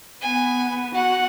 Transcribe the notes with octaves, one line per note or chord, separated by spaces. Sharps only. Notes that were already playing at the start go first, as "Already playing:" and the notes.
B3 G#5
F#4 F#5